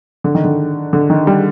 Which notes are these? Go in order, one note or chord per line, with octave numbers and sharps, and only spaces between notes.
D3
D#3
D3
D3
D#3
G3